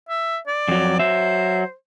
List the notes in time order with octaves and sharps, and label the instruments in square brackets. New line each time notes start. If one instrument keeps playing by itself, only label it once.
[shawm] E5
D5
[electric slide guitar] F2 F#3
[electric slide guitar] F#3 E5 [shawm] C5